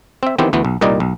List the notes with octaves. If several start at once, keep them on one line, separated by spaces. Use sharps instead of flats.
C4 E5
D#3 E3 B3 C4 G4
D2 E3 B3
B1
C2 A#2 G3 D#4 D5 D#5
B1